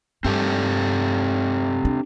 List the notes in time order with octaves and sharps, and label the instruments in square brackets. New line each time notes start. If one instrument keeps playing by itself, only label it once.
[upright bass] G2 [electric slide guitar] C4 G4 A4
[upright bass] D4